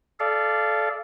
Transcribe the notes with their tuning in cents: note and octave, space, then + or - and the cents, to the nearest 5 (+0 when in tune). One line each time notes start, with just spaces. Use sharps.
A4 -20 D5 +0 F5 -25